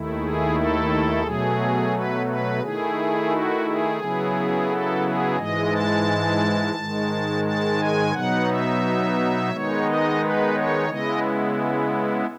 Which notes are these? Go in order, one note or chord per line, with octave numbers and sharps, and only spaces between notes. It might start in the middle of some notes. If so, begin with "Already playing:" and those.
Already playing: D#2 D#3 A3 E4
G#4
A4
B2 F#3 A3 G#4
B4
B4
D#3 A3 E4 G#4
F#4
G#4
C#3 F#3 B3 E4
A4
G#4
G#2 E3 G#3 D#5
A5
G#2 D#3 G#3
A5
G#5
B2 F#3 B3 D#4 F#5
E5
D#3 G#3 B3 D#4 C#5
D#5
B4
C#5
C#3 G#3 B3 E4 D#5